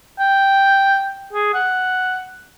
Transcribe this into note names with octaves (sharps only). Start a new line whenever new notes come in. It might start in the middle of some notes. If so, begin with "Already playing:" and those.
G5
G#4
F#5